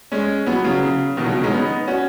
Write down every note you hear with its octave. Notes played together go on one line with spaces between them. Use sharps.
G#3 C#4
F#3 B3
C#3 F#3
C#3
B2 D#3
C#3 F#3
B2 D#3
G#3 C#4
B3 D#4
C#4 F#4